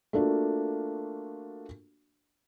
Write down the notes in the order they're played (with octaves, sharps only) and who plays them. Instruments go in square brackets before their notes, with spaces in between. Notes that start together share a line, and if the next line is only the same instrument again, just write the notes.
[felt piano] A3 A#3 D4 F4 F#4